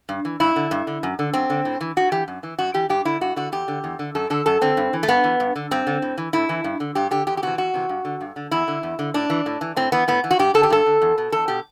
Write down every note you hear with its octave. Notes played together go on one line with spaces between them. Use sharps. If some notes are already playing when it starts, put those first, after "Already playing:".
G2
E3
G2 E4
D3
G2
D3
F#2
D3
F#2 C4
D3
A2
E3
A2 F#4
E3 G4
F#2
E3
F#2 F#4
E3 G4
G2 G4
D3 E4
G2 F#4
D3 F#4
E2 G4
D3
E2
D3
F#2 A4
D3 A4
F#2 A4
D3 C4
G2
E3
A3
G2 B3
E3
G2
D3
G2 C4
D3
A2
E3
A2 E4
E3
G2
D3
G2 G4
D3 G4
E2 G4
G4
C3 E3 F#4
E2 F#4
C3 E3
G2
D3
G2
D3
E2 E4
D3
E2
D3
A2 D4
E3
A2
E3
A2 C4
E3 B3
A2 B3
E3
F#4
G2 G4
D3 A4
G4
G2 A4
D3
E2
B2
E2 A4
B2 G4